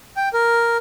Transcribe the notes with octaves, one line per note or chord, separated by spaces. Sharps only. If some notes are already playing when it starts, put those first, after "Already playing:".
G5
A#4